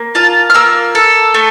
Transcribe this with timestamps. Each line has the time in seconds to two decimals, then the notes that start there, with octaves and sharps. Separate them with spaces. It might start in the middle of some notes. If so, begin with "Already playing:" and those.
Already playing: A#3
0.15 F4 A5
0.50 F6
0.54 A#3 E6
0.95 A4
1.34 A3